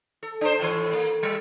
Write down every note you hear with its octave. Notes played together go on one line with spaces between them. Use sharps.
A4
D4 C5
A2 E3
A#3
G3